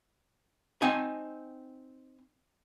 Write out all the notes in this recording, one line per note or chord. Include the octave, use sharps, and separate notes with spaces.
C4 D#4 D#5 G#5